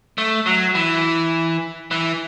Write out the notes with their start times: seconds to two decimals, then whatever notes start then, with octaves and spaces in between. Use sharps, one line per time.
0.18 A3
0.46 F#3
0.75 E3
1.91 E3